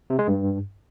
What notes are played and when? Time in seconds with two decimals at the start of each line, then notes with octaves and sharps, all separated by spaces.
0.10 C3
0.19 G#3
0.28 G2